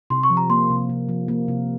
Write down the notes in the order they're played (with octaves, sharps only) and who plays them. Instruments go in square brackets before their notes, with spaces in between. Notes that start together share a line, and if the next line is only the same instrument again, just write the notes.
[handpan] C3 [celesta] C6
[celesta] C#6
[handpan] F3
[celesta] A#5
[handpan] A#3 [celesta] C6
[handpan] C3
C3
F3
A#3
C3